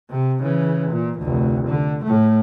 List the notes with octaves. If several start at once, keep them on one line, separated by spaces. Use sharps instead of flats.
C3
C#3 E3
A#2
F1 D2
D3
A2 A3